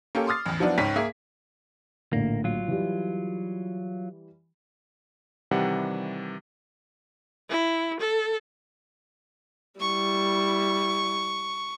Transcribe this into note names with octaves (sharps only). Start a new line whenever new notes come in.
A#3 C#4 G4 A4
C6 D6 D#6 F6 A6 C7
A1 E2
F3 F#3 B3 D4 E4
C#2 G#2 C#4 B6
A#3 G#4 E5
A#1 A2 D3 A#3
F#3 F4
E3 G3
C3 D#3 E3 G3 D5 F#5
E4
A4
G3 E4 C#6